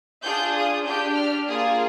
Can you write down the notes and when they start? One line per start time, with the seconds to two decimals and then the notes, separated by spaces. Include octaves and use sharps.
0.23 D4 F4 G#4 G6
0.55 D#6
0.85 D4 G4 G6
1.16 F6
1.48 A#3 F4 G#4 D#6